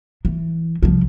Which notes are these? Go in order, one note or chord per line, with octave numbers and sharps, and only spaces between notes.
E3
C2 F3